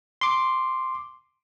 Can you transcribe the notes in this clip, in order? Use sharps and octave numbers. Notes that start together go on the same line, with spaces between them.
C6 D6